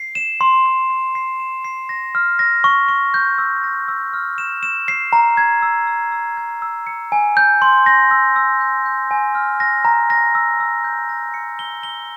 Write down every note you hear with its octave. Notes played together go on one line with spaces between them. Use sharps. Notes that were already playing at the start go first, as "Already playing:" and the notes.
Already playing: C7
E7
C6
C6
C6
C7
E7
C7
A#6
F6
A#6
C#6
C#6
G6
E6
A#6
E6
F6
E7
E7
C7
A#5
G#6
E6
E6
E6
G#6
E6
C#7
G#5
G6
C6
A#6
E6
E6
G6
G6
G#5
F6
A#6
A#5
A#6
E6
E6
G6
A#6
C#7
G7
G7